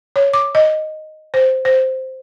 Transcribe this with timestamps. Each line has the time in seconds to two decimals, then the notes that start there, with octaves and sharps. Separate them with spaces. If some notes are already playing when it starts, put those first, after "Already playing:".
0.16 C#5
0.33 D6
0.55 D#5
1.34 C5
1.65 C5